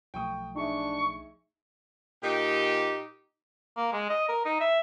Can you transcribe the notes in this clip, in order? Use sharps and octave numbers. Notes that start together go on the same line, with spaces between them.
B1 F3 A3 G5 C#6 D#6
D4 D#4 G#4 E5 C#6
A#2 D#4 G4
A#3
G#3
D#5
A#4
D#4
E5